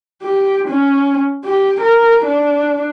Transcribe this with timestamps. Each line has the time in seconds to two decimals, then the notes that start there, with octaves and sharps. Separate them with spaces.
0.23 G4
0.68 C#4
1.45 G4
1.81 A#4
2.25 D4